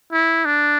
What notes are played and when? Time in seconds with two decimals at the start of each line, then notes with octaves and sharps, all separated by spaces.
0.12 E4
0.45 D4